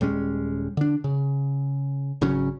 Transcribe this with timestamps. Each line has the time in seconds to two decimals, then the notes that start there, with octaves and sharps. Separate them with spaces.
0.01 D#1 G3 G#3 C#4
0.77 D3 D4
1.04 C#3
2.21 G#1 C#3 F#3 C#4